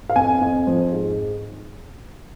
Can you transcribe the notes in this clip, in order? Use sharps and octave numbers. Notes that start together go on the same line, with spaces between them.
F5
F2 G#5
F2
F3
G#2